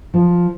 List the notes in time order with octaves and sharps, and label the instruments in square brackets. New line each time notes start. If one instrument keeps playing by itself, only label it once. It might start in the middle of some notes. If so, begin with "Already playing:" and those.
[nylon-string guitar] F3